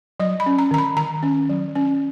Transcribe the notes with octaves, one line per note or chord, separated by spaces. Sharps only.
F#3 D#5
B5
C#4
A#5
D#3 A#5
B5
D#3 A#5
C#4
F#3
C#4